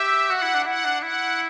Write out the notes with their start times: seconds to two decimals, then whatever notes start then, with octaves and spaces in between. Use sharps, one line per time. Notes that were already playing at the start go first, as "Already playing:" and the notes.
Already playing: G4 E5
0.30 F#4 F#5
0.42 E4
0.55 D4
0.66 E4 F#5
0.84 D4
1.03 E4 F#5